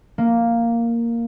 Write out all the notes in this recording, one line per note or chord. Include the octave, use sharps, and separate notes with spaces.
A#3